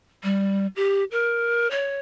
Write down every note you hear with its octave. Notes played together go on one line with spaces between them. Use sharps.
G3
G4
A#4
C#5